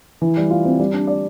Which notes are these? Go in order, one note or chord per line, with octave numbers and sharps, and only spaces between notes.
E3
G3
F4
C4
G3
D4
D5